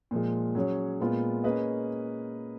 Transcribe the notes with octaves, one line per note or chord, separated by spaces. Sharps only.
A#2 F3 G#3
F#3 C#4 G#4 C#5
A#2 G#3 B3 F4
A#3 C#4 G#4 B4 D#5